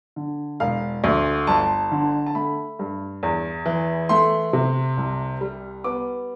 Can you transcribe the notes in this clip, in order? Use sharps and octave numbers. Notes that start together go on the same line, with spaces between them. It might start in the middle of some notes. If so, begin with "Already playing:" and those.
D3
E1 F5
D2
G1 A5
D3
A5
A3 B5
G2
E2
E3
A3 C6
C3
C2
G3
B3 D6